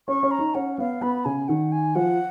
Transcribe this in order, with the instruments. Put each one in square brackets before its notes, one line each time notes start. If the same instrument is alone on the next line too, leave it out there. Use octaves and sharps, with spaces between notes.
[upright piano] C#4 [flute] C#6
[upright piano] C#4
[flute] A#5
[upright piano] D#4
[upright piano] C#4 [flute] F#5
[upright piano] B3 [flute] F5
[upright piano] B3 [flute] B5
[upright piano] C#3 [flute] G#5
[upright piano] D#3 [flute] F#5
[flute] G#5
[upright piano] F3 [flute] F#5